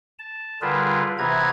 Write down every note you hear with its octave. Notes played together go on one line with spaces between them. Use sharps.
A5
D3 G3 F4 G#4 A#4 B4
C3 E3 B3 B4 A#5 G#6